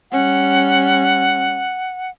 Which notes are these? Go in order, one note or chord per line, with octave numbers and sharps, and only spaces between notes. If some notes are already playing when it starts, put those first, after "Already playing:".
G3 C#4 F#5